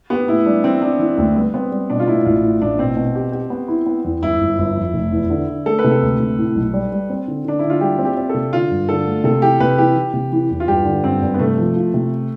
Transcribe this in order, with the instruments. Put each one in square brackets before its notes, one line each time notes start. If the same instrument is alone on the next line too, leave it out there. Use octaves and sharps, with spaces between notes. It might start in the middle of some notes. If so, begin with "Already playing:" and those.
[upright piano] B3 [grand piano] G4
[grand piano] A2 [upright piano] E4
[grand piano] G3 [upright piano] D4
[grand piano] E3 [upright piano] C4
[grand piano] E3 [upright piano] D4
[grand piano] E3
[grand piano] D2 [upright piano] C4
[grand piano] G3 [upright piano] B3
[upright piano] B3 [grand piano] C4
[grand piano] G3
[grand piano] B2 [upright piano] D4
[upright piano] F4
[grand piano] A2 [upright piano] E4
[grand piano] A1 [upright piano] F4
[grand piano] A2
[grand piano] A1 [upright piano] D4
[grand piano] B2 [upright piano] C4
[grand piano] B2
G4
G4
B3
E4
B3
E2
[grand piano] G1 [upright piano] E4
[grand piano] G1
G1
F2
F1
E2
D3
D3
[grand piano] A3 [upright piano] A4
[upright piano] B4
[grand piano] C3
[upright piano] A4
[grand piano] D2
C3
A2
B1
G3
G3
C4
D3
[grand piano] D3 [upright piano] D4
[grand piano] D3 [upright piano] E4
[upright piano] F4
[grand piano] G3 [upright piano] G4
[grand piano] C4
[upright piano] G4
[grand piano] C4
[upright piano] A4
[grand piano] C3
[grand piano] D3 [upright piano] F4
[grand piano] G2
[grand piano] D3 [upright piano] A4
[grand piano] A3
[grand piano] C3 [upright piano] A4
[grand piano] E3 [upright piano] G4
[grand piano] C3 [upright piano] B4
[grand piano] E3 [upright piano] G4
[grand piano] E3
C3
E3
E2
[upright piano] F4
[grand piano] G2 [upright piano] G4
[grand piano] D3
[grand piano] G2 [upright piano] C4
[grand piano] G2
[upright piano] B3
[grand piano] C3 [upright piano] A3
[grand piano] F3
F4
C3